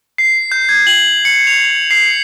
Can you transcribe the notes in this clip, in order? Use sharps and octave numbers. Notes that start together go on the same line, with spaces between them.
C7
G6
G#6
F#7
C#7
F7
C7